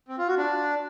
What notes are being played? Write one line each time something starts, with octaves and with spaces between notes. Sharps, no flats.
C4
F4
F#4
D4